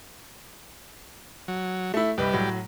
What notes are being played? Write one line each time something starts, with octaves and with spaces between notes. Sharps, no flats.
F#3
A3 E4
C2 G3 B4 D#5
A2 F#3